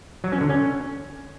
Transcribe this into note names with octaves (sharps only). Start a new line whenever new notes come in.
F#3
C#4
D3
C#4